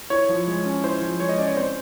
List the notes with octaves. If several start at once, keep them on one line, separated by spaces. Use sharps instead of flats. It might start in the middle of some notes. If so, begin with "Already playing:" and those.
E4 C#5
F3
G#3
C#4
E4 C5
F3
G#3 C#5
D#5
C#4 D5
C#5
C4 C5